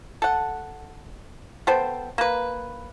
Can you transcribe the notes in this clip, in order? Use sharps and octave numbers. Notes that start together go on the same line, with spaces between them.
A4 F#5
B3 A4 C5 G5
A#3 B4